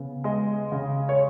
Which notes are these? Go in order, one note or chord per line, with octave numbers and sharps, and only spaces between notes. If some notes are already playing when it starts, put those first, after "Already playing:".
Already playing: C#3 B3
G#3 D#5
C#3
C#5